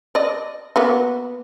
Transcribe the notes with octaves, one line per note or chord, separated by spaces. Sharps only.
D5 D#5
A#3 B3 F#4